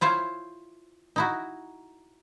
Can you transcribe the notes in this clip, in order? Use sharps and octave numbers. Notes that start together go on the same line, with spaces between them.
E4 F4 C5 C#5
D#4 E4 F#4